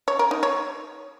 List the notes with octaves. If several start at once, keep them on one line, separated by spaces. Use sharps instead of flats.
C#5
A#4
D#4
C#5